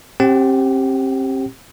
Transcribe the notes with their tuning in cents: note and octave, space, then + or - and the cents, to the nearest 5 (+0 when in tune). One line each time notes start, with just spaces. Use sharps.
C4 +35 G4 +0 F#5 +45